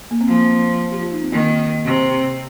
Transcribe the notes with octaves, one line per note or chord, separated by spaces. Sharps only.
A#3
C4
F3 A#3
G4
F4
D#4
C4
D#3 A#3
C3